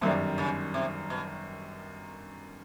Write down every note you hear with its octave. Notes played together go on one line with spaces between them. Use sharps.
G1 F#2 C3 D#3 G3
C#3
C3
B2